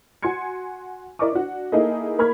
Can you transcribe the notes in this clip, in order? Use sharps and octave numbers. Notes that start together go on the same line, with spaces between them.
F#4 G#5 C6 G#6 C#7
E4 A#4 D5 D#5 C#6 D6
D4 F#4
A#3 D#4 E4 G#4 A4 D#5
A#3 A#4 B5 C#6 F6 G#6